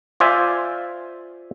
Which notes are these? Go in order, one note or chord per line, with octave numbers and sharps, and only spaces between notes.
F4 C5 D5 E5 G#5